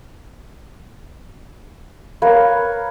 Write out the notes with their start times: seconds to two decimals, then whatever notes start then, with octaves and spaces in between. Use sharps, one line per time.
2.22 A#4 B4 C#5 F5